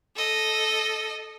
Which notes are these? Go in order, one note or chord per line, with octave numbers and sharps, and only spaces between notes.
A4 D#5